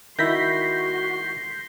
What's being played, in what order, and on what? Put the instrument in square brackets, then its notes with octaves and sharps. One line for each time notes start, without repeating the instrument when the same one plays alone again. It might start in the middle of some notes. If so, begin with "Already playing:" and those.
[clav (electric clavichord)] D#3 E4 [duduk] F#4 [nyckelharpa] C6 [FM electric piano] G6 A#6 B6